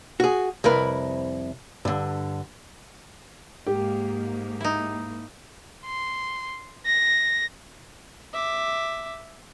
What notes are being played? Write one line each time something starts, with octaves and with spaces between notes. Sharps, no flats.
F#4 G#4
C2 F2 E4 A#4 B4
G2 D3
G#2 A#3 G4
D#4 E4
C6
A#6
E5 D6